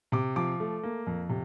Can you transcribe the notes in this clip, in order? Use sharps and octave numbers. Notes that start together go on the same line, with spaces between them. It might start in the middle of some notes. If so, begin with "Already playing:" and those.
C3 D6
F3 D6
A3
A#3
F2
C3